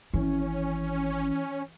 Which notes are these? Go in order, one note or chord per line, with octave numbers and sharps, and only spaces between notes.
G#1 E3 C#4